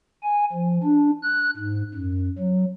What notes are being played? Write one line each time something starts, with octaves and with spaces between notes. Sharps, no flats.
G#5
F3
D4
F#6
G#2
F#2
F#3